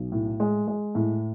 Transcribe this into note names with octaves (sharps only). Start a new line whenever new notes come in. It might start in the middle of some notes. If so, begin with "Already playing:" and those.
Already playing: B1
A2
G#3
G#3
A2